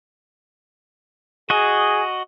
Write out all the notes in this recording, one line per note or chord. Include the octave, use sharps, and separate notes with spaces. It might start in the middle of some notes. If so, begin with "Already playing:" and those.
F#4 G#4 D#5